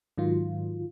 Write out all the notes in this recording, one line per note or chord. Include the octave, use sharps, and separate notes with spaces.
G#2 D#3 F#3 F4